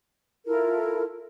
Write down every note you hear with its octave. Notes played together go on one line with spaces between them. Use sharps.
E4 F4 A4 A#4